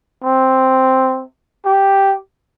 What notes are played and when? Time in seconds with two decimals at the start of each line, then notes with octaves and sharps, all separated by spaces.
0.24 C4
1.65 G4